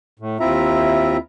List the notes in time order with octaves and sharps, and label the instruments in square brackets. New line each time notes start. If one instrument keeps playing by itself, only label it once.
[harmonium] A2
D#2 C4 E4 F4 E5 A#5